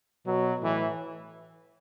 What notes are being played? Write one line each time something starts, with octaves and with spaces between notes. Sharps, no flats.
B2 F#3
A2 E3